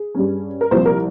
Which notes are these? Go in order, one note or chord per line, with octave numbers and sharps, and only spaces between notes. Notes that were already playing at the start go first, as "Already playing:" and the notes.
Already playing: G#4
G2 G3 C#4
A#4
C2 A#2 F3 C4 C5
A#4